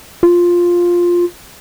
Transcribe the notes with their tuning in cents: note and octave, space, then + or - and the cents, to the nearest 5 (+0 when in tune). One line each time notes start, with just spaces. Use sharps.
F4 +5